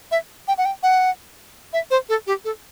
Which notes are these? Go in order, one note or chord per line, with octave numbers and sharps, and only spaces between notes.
E5
G5
F#5
G5
F#5
E5
C5
A4
G4
A4